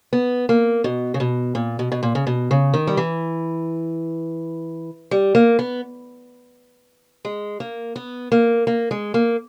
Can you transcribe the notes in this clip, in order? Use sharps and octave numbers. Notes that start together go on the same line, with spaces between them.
B3
A#3
B2
C#3
B2
A#2
B2
B2
A#2
C#3
B2
C#3
D#3
G3
E3
G3
A#3
B3
G#3
A#3
B3
A#3
A#3
G#3
A#3